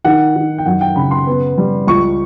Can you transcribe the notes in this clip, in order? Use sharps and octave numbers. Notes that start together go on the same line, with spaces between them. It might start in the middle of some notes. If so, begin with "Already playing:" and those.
D#3 F#5
D#3
G5
F#2 F#5
G5
C#3 B5
C6
B3
G3
C#2 C#6